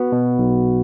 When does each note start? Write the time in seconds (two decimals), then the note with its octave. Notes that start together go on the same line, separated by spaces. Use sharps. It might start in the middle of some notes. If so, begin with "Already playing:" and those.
Already playing: B3 F#4
0.12 B2
0.39 B1